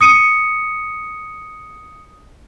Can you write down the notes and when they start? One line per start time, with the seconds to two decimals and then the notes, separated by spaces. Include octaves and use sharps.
0.01 D#6 C#7 D#7